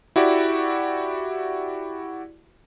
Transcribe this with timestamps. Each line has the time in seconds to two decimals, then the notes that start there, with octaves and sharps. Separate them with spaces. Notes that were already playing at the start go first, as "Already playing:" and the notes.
0.16 E4 F#4 G4 D5